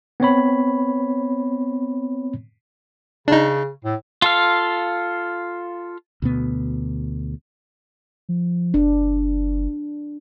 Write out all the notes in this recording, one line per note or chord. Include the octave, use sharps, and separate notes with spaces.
B3 C4 C#5 B5
C#3 D4 D#4
A2
F4 A4 F5
D2 B2 B3
F3
F#1 D4